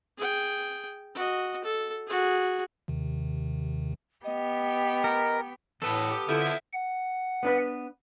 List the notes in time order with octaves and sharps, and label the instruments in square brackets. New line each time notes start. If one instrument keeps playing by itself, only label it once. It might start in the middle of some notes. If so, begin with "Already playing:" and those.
[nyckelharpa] G#4 G5
F#4 D#5
A4
F#4 G#4
[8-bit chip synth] D#2 C3 D#3
[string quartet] B3 G4 [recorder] D#5
[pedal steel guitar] A#4
[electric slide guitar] E2 B4 A5 [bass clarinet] A2 [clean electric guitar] B3 A4
[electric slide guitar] G4
[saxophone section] F2 E4 [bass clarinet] D3
[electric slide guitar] E5 F#5
[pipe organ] F#5
[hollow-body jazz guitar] B3 D4 B4